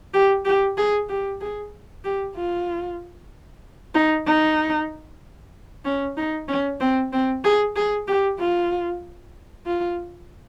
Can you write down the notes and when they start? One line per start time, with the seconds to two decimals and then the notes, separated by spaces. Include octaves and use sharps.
0.14 G4
0.45 G4
0.78 G#4
1.09 G4
1.41 G#4
2.04 G4
2.36 F4
3.95 D#4
4.26 D#4
5.85 C#4
6.17 D#4
6.48 C#4
6.80 C4
7.13 C4
7.44 G#4
7.76 G#4
8.08 G4
8.39 F4
9.66 F4